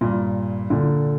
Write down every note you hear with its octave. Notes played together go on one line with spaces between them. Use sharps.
G2 A#2
A#2 D3